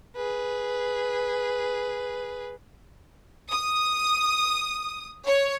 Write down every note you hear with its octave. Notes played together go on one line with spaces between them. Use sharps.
G#4 B4
D#6
C#5